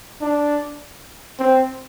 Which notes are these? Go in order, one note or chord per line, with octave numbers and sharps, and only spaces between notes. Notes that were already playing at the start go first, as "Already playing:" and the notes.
D4
C4